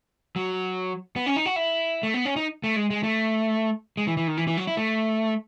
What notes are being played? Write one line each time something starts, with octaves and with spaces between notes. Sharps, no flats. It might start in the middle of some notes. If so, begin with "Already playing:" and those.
F#3
B3
C#4
D#4
F#4
E4
A3
B3
C#4
D#4
A3
G#3
G#3
A3
G#3
E3
E3
D#3
E3
E3
F#3
E4
A3